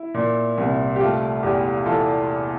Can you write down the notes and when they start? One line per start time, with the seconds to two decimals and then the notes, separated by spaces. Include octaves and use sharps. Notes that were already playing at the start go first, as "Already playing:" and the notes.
Already playing: E4
0.15 A#2
0.58 C2
0.96 G4
1.00 A3 F4
1.43 E2 G4
1.86 E3 F4 A4